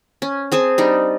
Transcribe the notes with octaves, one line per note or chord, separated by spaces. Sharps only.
C#4
C4 G#4 G#5 A5
G3 D4 D#4